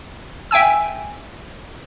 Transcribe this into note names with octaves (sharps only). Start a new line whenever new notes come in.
E5 G5 G#5 E6